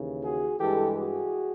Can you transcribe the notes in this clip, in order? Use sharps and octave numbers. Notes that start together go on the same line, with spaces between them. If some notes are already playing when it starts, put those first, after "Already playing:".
Already playing: D#2 C#3 E3
F#4 G#4
G2 E3 G#3 G4 A4
F#4 G#4